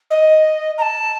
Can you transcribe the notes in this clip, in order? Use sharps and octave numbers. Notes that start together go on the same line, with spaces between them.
D#5
A#5
A5